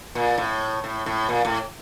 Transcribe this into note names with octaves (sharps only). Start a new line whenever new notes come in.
A#2
A2
A2
A2
A#2
A2